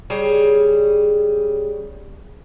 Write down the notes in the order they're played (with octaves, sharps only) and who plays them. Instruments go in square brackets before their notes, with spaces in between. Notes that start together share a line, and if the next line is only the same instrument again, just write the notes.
[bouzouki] C#3 G3 G#4